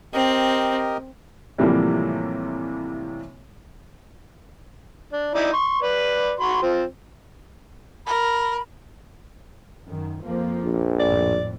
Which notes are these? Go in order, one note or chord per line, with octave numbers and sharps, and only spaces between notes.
C4 G4 A#4 D#5
A2 C3 E3 F3 G3 A#3
D4
D#4 E4 D5
C6 C#6
B4 D5
F#4 B5 C6
F3 C4
A#4 B5
F#2 D#3
F2 F3 A#3
A#1
G#1 F2 A2 D5